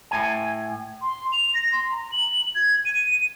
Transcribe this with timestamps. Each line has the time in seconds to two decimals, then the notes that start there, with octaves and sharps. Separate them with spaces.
0.11 A2 G#5
1.02 C6
1.32 F7
1.54 A#6
1.72 C6
1.92 A#5
2.12 F#7
2.55 G#6
2.85 D#7